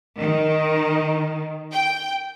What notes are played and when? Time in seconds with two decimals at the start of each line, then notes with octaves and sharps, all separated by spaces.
0.19 D#3
1.72 G5